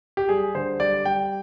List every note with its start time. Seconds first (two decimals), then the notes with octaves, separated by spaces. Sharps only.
0.17 G4
0.29 G3 G#4
0.55 D3 C5
0.80 G3 D5
1.05 G3 G5